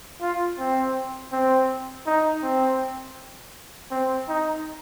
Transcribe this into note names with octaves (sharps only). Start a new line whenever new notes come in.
F4
C4
C4
D#4
C4
C4
D#4